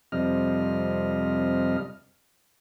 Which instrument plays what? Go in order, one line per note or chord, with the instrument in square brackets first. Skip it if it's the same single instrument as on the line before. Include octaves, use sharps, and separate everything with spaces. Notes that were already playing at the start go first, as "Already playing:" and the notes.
[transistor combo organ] F2 C3 G3 D#5 F6